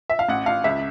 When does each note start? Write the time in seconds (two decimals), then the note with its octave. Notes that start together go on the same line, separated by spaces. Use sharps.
0.10 E5
0.19 F5
0.29 A1 F#5
0.46 A1 F5
0.64 C#2 E5